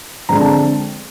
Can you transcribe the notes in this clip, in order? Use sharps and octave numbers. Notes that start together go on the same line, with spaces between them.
D3 F3 G#3 C4 A#5
A5